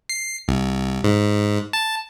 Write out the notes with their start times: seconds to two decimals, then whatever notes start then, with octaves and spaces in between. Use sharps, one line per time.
0.09 C7
0.48 C2
1.04 G#2
1.73 A5